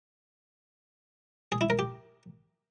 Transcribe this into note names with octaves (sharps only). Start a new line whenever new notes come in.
G#4
E4
A#4
G4